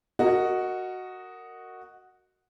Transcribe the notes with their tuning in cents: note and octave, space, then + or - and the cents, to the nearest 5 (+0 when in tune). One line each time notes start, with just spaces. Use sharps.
F#4 +0 A#4 -20 D#5 +0